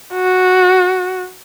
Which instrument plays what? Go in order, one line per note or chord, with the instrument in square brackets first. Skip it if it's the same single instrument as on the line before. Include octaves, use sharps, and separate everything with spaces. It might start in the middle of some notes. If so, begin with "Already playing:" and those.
[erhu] F#4